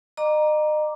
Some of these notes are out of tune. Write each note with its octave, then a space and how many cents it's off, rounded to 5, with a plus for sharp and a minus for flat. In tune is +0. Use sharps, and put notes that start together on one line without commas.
D#5 -35 A#5 +10 D6 +0